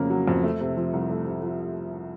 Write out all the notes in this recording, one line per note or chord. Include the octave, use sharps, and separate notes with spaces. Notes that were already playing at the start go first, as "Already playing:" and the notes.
Already playing: F2 C#3 F#3 A#3
F#3
F2
A3
C3
F3
C2
A3
C3
F3